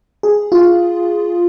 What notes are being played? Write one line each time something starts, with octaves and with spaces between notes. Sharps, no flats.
G#4
F4